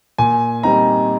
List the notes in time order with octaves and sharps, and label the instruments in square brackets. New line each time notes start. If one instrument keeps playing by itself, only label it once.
[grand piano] A#2 G#5
G3 C4 D#4 A#5